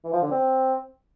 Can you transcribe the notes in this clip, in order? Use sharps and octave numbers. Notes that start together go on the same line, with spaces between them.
E3
F3
D3
C4